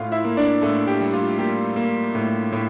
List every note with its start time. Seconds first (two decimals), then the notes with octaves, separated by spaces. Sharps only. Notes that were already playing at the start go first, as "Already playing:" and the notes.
Already playing: A2 F4 F5
0.12 E4 E5
0.25 A#3
0.37 D4 D5
0.62 A2 A3 A4
0.87 G4
1.01 G3
1.14 F4
1.39 A#3 G4
1.76 A#3
2.15 A2
2.53 A2